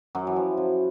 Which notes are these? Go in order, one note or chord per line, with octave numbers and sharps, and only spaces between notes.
F#2 F#3
E3
F3
F#2 F#3